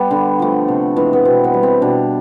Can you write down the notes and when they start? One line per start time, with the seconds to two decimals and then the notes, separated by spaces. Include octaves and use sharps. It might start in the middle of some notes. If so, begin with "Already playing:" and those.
Already playing: G3 B3
0.11 D3
0.40 F3 A3
0.68 C3
0.96 E3 G#3
1.13 B3
1.25 B2 C4
1.44 B3
1.54 G3
1.63 C4
1.82 B2 D4